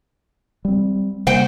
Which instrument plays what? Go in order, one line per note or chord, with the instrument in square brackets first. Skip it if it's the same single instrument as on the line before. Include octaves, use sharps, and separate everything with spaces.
[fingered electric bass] G3 C4
[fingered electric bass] C3 G3 A#3 [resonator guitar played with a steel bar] C5 F#5 G5